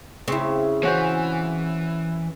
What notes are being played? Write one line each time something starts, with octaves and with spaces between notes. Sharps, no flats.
C#3 C4 E4
E3 C#4 F#4 C5